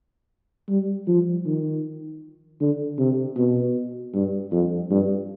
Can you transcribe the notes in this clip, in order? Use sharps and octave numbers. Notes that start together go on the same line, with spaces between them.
G3
F3
D#3
D3
C3
B2
G2
F2
G2